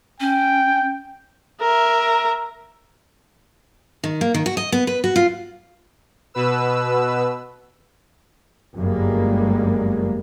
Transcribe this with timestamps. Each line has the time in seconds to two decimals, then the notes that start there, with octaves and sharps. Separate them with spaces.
0.20 C#4 G5
1.61 A#4 E5
4.04 D#3
4.21 A#3
4.34 D#3
4.46 F#4
4.57 D#5
4.72 B3
4.87 B4
5.04 F#4
5.16 F4
6.34 B2 B4 E6
8.77 G1 F#2 G3 G#3 A#3